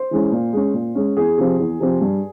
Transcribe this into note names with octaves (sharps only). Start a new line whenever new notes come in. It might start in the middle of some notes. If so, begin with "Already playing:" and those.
Already playing: C5
E3 G#3 C#4
A#2
G#3 C#4
A#2
G#3 C#4
E2 G#4
C3 F3 C4
E2
C3 F3 C4
G2